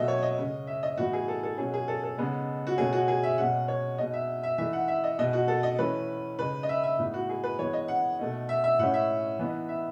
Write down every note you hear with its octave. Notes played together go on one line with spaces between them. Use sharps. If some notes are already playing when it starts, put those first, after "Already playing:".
Already playing: B2 F#3 A3 D#5 E5
C#5
D#5
C#3 G#3 C#4
E5
D#5
A2 E3 B3 D#4 F#4
G#4
A4
A4
B2 F#3 C#4 G#4
G#4
A4
A4
C#3 G#3 B3 D#4
F#4
B2 A3 C#4 G#4
F#4
G#4
E5
B2 G#3 C#4 F#5
C#5
B2 G#3 D#4 D#5
E5
E5
E3 A3 D#4 E5
F#5
E5
D#5
B2 G#3 D#4 D#5
F#4
A4
D#5
E3 A3 C#4 B4
C#3 G#3 D#4 B4
D#5
E5
E5
A2 G#3 B3 D#4
F#4
G#4
B4
E3 G#3 B3 C#5
D#5
F#5
B2 A3 D#4
E5
E5
A2 G#3 C#4 F#5
E5
E3 B3 D#4
E5